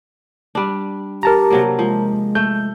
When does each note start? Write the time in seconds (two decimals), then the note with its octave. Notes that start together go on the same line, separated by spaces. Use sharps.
0.55 G3 D4
1.23 G4 A#4 A5 A#5
1.50 C3 F#3 A#3
1.79 F3 G#3
2.35 A3 G6